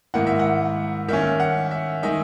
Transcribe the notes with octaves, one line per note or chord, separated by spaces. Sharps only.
G#2 D#3 A#3 E4 F#5
E5
F#5
D#3 A#3 C#4 E5
F#5
E5
D#3 G#3 D#4 E5